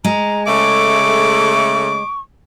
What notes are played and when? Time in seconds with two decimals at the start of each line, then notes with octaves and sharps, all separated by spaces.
0.04 G#3 A#5
0.47 C#3 A3 C#6 D6